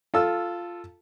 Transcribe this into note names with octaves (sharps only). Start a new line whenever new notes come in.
F4 A4 E6